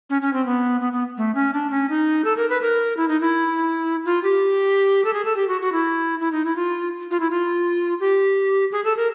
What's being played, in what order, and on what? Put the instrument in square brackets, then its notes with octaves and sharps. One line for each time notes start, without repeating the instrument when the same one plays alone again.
[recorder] C#4
C#4
C4
B3
B3
B3
A3
C#4
D4
C#4
D#4
A4
A#4
B4
A#4
E4
D#4
E4
F4
G4
A4
G#4
A4
G4
F#4
F#4
E4
E4
D#4
E4
F4
F4
E4
F4
G4
G#4
A4
A#4